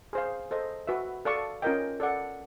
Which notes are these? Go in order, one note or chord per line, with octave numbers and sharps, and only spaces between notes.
G#4 C5 F5
A4 C5 D#5
F#4 B4 E5
A4 D5 F5 A5 C#6
C#4 F4 A#4 D#5 G5
A4 D5 F#5